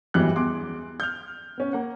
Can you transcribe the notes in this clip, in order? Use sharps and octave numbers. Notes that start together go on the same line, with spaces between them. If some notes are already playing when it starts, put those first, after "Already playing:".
G#1 E2 E3 F#3 G3 F#6
E2 C6 D6
F6 G6
B3 C#4
A#3 F#5